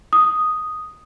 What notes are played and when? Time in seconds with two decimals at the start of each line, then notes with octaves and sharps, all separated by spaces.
0.13 D#6